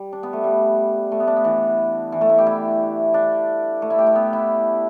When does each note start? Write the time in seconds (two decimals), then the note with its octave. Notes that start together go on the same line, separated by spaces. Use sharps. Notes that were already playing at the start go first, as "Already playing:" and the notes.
Already playing: G3
0.13 D4
0.23 B3
0.33 A3
0.44 G3
1.12 A3
1.20 B3
1.27 D4
1.36 B3
1.45 E3
2.12 E3
2.21 A3
2.29 E4
2.38 G4
2.47 E4
3.14 D4
3.82 A3
3.90 E4
3.98 G4
4.07 E4
4.15 B3
4.33 E4